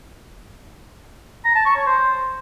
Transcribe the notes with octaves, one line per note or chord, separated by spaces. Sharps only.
A#5
A5
C#6
C#5
C5